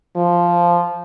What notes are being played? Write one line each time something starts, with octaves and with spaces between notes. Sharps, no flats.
F3